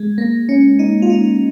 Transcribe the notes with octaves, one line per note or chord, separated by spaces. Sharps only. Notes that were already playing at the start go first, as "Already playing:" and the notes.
Already playing: G#3
A#3
C#4
D#4
F4
D#4